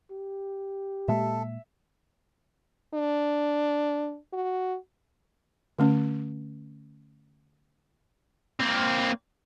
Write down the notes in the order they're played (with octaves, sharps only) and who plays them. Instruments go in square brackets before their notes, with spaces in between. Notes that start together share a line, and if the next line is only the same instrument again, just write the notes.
[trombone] G4
[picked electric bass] A#2 G#3 A#3 [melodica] A4 [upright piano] E5
[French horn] D4
F#4
[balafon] D3 A3 C#4
[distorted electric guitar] A#3 C4